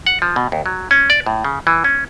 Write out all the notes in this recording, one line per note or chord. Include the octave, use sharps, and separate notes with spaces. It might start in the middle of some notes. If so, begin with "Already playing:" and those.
F#5
F3
B2
D#2
F#3
C#4
D5
A2
C#3
E3
C#4